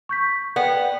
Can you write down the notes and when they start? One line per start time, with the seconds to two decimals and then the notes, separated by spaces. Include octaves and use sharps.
0.09 C#6 G6 B6
0.56 B3 D5 F#5 G5